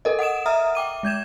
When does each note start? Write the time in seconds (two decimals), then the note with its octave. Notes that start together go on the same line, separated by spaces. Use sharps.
0.05 A4 A#4 D#5
0.19 F#5 D#6 D7 E7
0.46 E5 A#5 D#6 F6
0.75 G5 D6 D#7
1.03 G#3 G6 G#6 E7